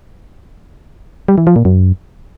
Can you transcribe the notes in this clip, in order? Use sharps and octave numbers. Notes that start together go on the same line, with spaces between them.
G3
E3
F3
A#2
F#2